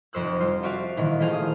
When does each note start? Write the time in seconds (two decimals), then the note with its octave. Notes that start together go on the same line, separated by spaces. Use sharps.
0.13 F1 F2 C5 E6 F#6
0.40 G3 F4 C5 C7
0.63 F4 F#4 D5 E5 F5
0.97 A#2 D#3 E3
1.20 A3 A#3 F4 G#4 C5 F5
1.33 D#6